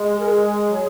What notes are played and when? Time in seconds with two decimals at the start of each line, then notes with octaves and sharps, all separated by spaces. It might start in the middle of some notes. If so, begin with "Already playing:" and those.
Already playing: G#3
0.11 G#4
0.20 A#4
0.29 G#4
0.69 F#3